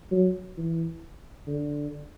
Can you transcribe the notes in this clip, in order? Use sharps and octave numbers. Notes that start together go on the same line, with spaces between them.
F#3
E3
D3